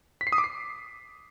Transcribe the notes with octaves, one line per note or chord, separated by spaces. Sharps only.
B6
C7
D#6
D6
C7